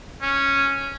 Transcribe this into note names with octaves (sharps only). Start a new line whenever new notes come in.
C#4